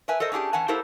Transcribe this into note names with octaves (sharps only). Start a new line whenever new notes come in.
A#4 B4 E5 G#5
A4 A#4 C5 D#5
C#4 D4 F4 G4 G#4
E3 C#4 F#5 G#5 A5
A#3 E4 G4 A4 A#4 C5